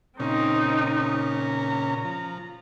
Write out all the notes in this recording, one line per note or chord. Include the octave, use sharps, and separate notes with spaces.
A#2 C#3 C4 C#4 D#4
A#5
F3